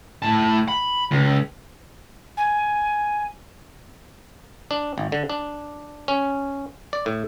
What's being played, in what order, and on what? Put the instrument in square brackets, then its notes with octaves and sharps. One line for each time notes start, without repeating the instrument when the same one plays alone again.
[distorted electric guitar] A2 A5
B5
C#2
[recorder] G#5
[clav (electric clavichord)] D4
G#1
D3
D4
C#4
D5
A2